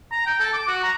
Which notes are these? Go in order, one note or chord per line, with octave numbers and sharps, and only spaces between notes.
A#5
G5
A4
D6
F#4
A#5